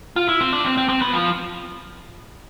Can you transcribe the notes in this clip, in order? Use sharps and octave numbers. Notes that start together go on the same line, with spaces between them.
F4
E4
C4
D4
C4
C4
C4
B3
F3